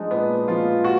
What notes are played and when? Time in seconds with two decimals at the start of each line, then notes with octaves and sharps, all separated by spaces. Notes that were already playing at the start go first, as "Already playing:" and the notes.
Already playing: F3 G#3 D4 D#4
0.11 A#2 B3
0.48 F3 F4
0.84 F#4